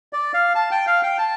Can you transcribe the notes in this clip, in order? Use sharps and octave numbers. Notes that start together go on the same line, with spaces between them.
D5
F5
A5
G5
F5
G5
A5